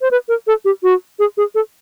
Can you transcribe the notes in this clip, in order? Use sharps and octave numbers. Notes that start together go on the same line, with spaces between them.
C5
B4
A#4
A4
G4
F#4
G#4
G#4
A4